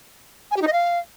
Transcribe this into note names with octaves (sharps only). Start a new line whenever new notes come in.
G#5
G4
D#4
D#5
F5